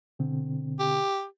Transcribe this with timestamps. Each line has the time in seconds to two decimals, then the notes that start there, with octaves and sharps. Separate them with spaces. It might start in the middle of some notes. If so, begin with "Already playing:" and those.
0.19 B2 D3 C4
0.80 G4